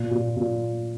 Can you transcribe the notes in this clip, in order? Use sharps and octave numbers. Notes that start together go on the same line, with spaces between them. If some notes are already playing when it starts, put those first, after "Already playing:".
Already playing: A#2
A#2
A#2